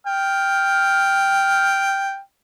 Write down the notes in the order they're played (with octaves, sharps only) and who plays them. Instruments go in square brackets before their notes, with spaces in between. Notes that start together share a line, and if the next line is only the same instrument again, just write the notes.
[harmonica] G5 F6